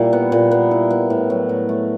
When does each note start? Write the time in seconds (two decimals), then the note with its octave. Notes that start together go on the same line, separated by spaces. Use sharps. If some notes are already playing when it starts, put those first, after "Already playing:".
Already playing: A#2 G3 E4
0.13 B3
0.32 A#2
0.51 B3
0.71 E4
0.90 B3
1.10 A2
1.30 F#3
1.49 A2
1.69 A3